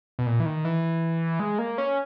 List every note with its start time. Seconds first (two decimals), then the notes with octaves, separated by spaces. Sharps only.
0.19 B2
0.27 A#2
0.40 E3
0.46 D#3
0.65 E3
1.40 G#3
1.58 A#3
1.78 C#4